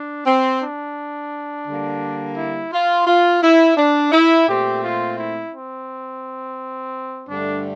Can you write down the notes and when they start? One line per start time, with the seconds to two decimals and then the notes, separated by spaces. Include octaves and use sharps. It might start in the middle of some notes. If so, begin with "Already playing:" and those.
Already playing: D4
0.26 C4
0.60 D4
1.67 D3 G3 A#3
2.37 E4
2.72 F4
3.07 F4
3.42 E4
3.77 D4
4.12 E4
4.47 A#2 A3 C4 G4
4.84 F4
5.18 E4
5.53 C4
7.29 G2 D3 A3 D4